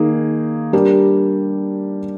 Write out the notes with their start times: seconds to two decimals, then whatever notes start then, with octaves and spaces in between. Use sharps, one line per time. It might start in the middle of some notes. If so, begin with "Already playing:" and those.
Already playing: D#3 A#3 D#4 G#4
0.73 G3 D4 G4 A#4